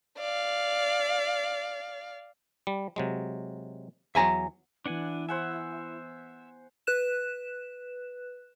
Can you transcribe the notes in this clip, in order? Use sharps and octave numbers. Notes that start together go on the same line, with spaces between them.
D5 F5
G3
C3 F#3 G#3
E2 F#3 E5 G#5 A#5
E3 B3 D4 E4 F#5 G#5
C5 E5 F#5 G#5
B4 F#6 E7